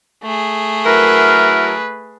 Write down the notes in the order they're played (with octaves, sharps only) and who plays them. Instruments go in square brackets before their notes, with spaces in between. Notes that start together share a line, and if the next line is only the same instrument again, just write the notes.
[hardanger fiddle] A3 G#4
[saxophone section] F#3 E4 A#4 [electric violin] B4